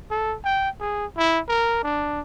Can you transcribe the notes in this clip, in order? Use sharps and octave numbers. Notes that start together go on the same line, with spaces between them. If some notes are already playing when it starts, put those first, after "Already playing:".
A4
G5
G#4
E4
A#4
D4